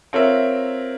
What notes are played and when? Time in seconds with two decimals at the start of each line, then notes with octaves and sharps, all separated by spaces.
0.13 C4 F4 A#4 C#5 E5